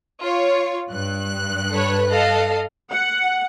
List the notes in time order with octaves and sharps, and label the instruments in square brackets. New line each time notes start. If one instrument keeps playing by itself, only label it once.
[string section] F4 C#5
G2 F#6
[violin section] A4 B4 C#5
A4 D#5 F5
[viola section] F#5